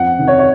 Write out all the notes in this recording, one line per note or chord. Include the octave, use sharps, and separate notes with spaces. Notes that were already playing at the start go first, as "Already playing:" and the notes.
Already playing: F2 F#5
C3 D#3
C#5
C#5